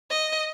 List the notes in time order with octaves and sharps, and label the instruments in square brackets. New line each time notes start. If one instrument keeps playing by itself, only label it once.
[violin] D#5